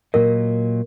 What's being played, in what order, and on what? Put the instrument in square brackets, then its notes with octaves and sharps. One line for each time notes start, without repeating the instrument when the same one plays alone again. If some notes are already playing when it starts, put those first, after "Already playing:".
[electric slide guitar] A#2 F#3 D#5 [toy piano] A#4